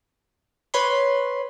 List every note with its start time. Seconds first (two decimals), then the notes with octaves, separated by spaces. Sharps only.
0.74 B4 C#5 B5 C6